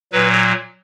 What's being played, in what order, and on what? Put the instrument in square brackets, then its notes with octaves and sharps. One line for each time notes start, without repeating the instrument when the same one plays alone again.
[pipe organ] A#2 F#3 B4